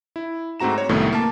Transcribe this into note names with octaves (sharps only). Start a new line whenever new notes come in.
E4
G#2 A3 C4 F#4 A#5 E7
C#5
C2 F#2 A2 D#3 A3 B3
A#3 A5